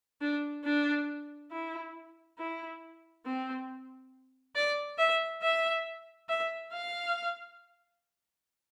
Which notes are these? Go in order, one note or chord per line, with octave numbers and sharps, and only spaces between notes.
D4
D4
E4
E4
C4
D5
E5
E5
E5
F5